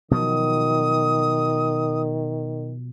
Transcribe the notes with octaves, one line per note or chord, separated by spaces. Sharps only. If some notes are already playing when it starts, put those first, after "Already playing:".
B2 D#3 F3 F#3 D#6